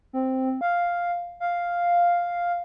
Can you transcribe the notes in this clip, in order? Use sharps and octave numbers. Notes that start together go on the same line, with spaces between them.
C4
F5
F5